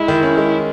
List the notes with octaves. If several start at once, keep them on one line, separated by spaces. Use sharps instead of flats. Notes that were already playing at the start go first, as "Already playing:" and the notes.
Already playing: G#3 E4
D#3
C#4
G#3